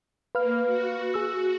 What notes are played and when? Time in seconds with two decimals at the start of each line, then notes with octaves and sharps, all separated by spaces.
0.35 A#3 B4 F5 F6
0.66 F#4
1.14 G#4 E6